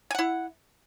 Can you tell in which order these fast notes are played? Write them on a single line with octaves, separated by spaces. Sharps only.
G#5 F#5 E4